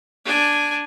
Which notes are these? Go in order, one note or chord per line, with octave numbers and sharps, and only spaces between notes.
D4 G#5